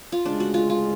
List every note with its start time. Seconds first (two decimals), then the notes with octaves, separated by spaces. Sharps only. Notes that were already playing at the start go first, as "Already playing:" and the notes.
0.12 F4
0.25 D2 C#3 G#3 D4
0.40 F#4
0.54 F4
0.70 F4